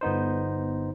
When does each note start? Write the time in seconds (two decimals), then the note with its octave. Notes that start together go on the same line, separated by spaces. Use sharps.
0.01 G1 B3 D#4 C5